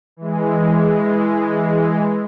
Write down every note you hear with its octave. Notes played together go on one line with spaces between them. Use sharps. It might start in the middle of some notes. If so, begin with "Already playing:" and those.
E3 G#3